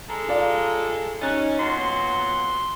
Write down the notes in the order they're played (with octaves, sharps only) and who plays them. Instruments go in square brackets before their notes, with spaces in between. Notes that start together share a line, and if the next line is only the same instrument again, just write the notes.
[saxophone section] G#3 A4 [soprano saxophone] A#5
[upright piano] F4 D5 F5
[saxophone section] C#4 [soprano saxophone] D#4 [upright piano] F#6 A6
[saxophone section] A#2 F#3 B3 [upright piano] A#5 C#6 [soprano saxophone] C6